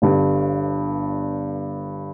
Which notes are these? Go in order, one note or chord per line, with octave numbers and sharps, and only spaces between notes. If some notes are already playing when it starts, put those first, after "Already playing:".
G1 G2 D3